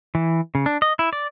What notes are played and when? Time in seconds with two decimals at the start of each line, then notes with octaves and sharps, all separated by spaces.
0.15 E3
0.55 C#3
0.66 D4
0.82 D#5
0.99 E4
1.13 D5